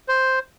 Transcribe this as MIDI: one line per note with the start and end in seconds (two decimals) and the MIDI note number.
0.08 0.39 72